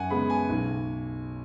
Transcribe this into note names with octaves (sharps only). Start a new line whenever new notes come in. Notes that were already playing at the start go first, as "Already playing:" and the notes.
Already playing: F#2 F#5 G#5
C#3 G#3 B3 B5
G#5
B1